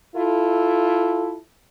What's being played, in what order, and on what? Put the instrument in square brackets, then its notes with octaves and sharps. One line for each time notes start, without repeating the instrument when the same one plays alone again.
[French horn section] E4 F4 A4